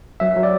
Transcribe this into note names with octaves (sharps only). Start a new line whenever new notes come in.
F#3 E5
F#3
D5